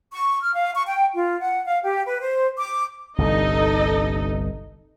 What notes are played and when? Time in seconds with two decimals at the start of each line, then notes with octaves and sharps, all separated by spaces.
0.11 C#6
0.42 F6
0.55 F5
0.75 C#6
0.87 G5
1.15 F4
1.41 F#5
1.66 F5
1.84 G4
2.06 B4
2.20 C5
2.56 D6
3.18 G1 C2 G2 D#4 A4 D#5